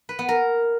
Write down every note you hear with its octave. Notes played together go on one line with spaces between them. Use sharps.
B4
B3
A#4